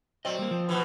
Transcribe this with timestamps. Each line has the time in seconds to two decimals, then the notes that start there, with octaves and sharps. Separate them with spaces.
0.25 F#3 C4 D5 D#5
0.39 G3 A#3
0.51 F3
0.69 B2 E3